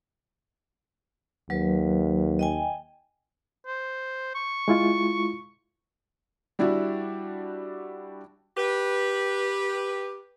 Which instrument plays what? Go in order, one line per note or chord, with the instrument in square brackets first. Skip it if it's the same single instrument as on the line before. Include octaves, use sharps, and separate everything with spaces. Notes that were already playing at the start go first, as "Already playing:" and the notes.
[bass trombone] D#2 [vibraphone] F#3 B4
[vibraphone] D#5 G5 G#5
[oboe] C5
C#6
[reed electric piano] G#3 E4 F4
[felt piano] G3 D4 E4 F#4
[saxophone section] G4 B4